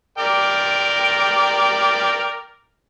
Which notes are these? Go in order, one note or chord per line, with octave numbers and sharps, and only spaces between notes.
A#4 D5 G5